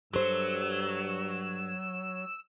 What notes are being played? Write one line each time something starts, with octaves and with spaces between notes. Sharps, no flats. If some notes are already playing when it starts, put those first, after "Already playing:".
G2 F#3 G4 A4 C5 E6